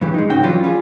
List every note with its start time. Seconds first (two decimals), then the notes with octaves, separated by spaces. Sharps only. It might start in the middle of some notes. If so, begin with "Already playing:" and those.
0.01 G2 E3 G4
0.14 G#3 D#4
0.30 C#2 G#2 C#4 F#4 G5
0.43 E3 F#3 G3 C#4 F4
0.64 G3 F4 G#4